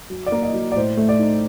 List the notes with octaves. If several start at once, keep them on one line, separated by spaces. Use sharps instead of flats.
F#3
D5
A#3
D#5
F#3
D5
A2 C5
A3
D5
D#4